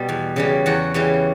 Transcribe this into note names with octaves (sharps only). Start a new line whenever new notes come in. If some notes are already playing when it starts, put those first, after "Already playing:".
Already playing: B2 G3
E2
C#3 E3 G3
E2 F#4
C#3 E3 G3